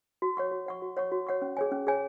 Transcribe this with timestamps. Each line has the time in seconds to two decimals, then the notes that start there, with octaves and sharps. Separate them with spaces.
0.22 F#4
0.37 C#5 F#5 C#6
0.51 F#4
0.66 C#5 F#5 C#6
0.82 F#4
0.97 C#5 F#5 C#6
1.12 F#4
1.27 C#5 F#5 C#6
1.42 C#4
1.57 G#4 C#5 G#5
1.72 C#4
1.87 G#4 C#5 G#5